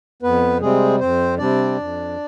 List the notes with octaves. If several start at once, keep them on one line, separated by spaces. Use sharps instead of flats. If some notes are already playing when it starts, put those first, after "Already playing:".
F2 B3 B4
C3 G3 G#3 C4 G#4
F2 C4 C5
C3 G3 C4 D4 D5
F2